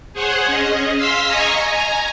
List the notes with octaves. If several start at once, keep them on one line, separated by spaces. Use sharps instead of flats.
G#4 C5 C#5 F#5
C#4 G#4 D#5
F5 C6 E6 B6
D#5 G#5 A#5 C#6
G#5 A#5